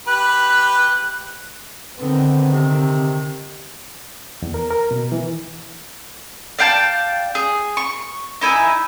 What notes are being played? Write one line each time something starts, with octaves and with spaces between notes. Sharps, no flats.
G4 B4 F#6
D3 D#3 B3 C4
C3 D#3
E2
A#4
A#4
B2
E3
D5 F5 G5 A5
G#4
C#6
D#4 E4 G#5